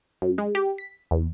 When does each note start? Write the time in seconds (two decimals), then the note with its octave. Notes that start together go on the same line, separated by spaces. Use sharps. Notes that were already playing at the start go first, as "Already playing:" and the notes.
0.22 F#2
0.38 G#3
0.55 G4
0.78 B6
1.11 E2